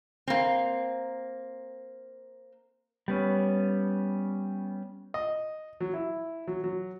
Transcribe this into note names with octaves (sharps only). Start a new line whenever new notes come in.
A#3 C4
G3 B3 C#4
D#5
F#3
E4
F#3
F#3